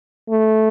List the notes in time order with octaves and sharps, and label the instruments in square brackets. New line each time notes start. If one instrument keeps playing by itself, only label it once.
[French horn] A3